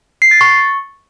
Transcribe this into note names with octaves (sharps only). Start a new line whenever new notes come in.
C7
A6
C#6